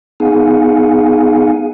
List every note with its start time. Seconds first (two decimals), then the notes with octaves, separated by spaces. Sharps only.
0.20 B3 D#4 G#4 F5 F#5 G#5